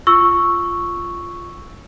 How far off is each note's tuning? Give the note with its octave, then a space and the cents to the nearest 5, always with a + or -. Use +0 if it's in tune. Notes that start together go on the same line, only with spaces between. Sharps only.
F4 -10 C#6 +0 E6 +0